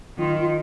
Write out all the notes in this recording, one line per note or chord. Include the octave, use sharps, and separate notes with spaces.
D#3 F4
F4